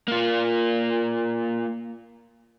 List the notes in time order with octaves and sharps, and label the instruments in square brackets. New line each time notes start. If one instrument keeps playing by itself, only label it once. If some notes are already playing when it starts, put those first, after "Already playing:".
[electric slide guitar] A#3 F4